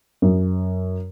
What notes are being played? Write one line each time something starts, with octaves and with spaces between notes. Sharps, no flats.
F#2